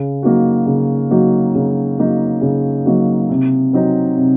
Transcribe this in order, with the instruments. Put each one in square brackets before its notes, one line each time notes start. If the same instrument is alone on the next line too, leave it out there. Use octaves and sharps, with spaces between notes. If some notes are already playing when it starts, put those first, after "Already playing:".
Already playing: [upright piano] C#3
F#3 A#3 D#4 F#4
C#3
F#3 A#3 D#4 F#4
C#3
F#3 A#3 D#4 F#4
C#3
F#3 A#3 D#4 F#4
C3
F#3 C4 D#4 F#4
C3